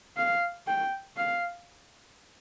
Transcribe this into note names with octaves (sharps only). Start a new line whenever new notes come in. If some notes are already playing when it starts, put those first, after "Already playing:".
F5
G5
F5